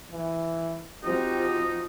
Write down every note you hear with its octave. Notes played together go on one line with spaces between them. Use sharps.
E3
F3 C4 D#4 F#4 G4